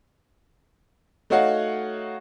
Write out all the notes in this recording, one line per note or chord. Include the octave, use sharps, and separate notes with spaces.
A3 D#4 F#4 C#5 F5 F#5